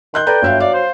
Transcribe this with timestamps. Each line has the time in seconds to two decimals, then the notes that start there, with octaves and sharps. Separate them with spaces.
0.14 D#3 C6 F#6 G6
0.27 A4 B4 D5 G5 A#5
0.42 G1 F#3 E5 F5
0.60 D5 F5
0.74 C5